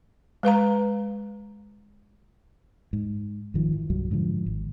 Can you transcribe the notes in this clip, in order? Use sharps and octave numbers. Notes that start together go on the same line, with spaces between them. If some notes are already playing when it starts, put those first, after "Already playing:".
G#3 B4 F5 A#5
G#2
G#1 D#3 F3
E3
C2 G2 F#3
G#2 D3 D#3 F3
G#1